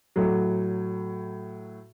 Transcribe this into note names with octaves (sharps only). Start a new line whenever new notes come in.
A2 F#3